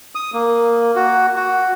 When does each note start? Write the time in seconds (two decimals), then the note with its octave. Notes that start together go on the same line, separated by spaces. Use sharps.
0.15 D#6
0.34 A#3
0.96 F#4
1.36 F#4